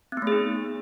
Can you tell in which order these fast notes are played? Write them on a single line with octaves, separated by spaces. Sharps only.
C4 B3 A3 G#4 D#4